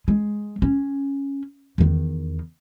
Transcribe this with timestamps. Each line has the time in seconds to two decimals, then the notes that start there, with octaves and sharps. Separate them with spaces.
0.08 G#3
0.62 C#4
1.78 E2 D#3